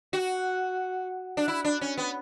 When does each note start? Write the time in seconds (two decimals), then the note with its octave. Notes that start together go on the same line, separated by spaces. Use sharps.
0.13 F#4
1.37 D4
1.48 E4
1.64 D4
1.81 C#4
1.97 B3